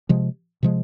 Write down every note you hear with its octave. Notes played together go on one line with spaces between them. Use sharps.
C3 F3 G#3
C3 F3 G#3